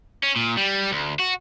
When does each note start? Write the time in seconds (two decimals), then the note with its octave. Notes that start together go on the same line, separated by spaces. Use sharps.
0.23 C#4
0.36 A#2
0.57 G3
0.92 D2
1.19 F#4